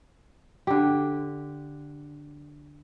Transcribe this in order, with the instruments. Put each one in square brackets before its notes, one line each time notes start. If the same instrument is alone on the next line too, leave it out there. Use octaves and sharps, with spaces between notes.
[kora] D3 G4